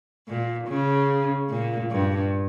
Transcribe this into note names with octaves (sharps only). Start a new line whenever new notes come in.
A#2
C#3
A#2
G2